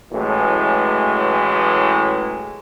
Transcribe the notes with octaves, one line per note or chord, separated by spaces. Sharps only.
A1 A2 E3 F#3 G#3